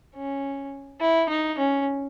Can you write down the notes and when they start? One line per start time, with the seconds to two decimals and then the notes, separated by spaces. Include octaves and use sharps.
0.15 C#4
1.01 E4
1.29 D#4
1.58 C#4